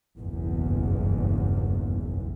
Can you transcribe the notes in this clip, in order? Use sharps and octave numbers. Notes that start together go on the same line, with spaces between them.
F#1 B1 E2 G2